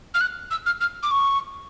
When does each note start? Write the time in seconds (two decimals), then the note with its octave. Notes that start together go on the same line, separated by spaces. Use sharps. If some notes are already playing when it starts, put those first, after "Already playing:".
0.14 F6
0.21 F#6
0.51 E6
0.66 F6
0.81 F6
1.03 D6
1.11 C#6